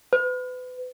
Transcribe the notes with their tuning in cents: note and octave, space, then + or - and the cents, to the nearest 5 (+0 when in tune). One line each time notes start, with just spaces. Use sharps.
B4 +35